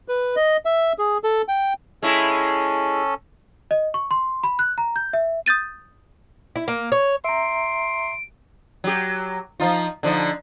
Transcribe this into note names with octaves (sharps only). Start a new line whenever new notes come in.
B4
D#5
E5
G#4
A4
G5
G#3 C#4 E4 A4
D#5
C#6
C6
B5
F#6
A#5
G6
E5
D#6 G6 A6 D#7
E4
A#3
C#5
E5 A#5 C6 D7
F#3 G4
F3 D#4 F4
D3 F3 D#4